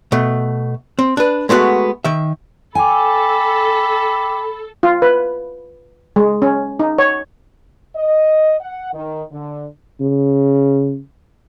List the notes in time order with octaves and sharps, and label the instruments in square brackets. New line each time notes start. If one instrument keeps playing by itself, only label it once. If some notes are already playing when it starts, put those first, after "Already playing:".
[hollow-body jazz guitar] B2 A3
C4
D4 B4
G#3 A3 B3 D#4 F#4
D#3 E5
[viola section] A4 [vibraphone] G5 D6 [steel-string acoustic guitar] G#5 [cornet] B5
[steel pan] F4
B4
G#3
C#4
D#4
C#5
[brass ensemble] D#5
F#5
D#3
D3
[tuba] C#3